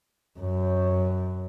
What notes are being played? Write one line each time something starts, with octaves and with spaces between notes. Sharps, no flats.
F#2